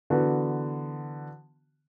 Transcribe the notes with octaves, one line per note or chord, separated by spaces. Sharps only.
D3 E3 B3 F#4